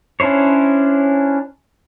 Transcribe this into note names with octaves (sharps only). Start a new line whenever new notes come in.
C#4 D4 E4 C5 C#5